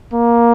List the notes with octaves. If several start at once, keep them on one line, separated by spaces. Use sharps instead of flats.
A#3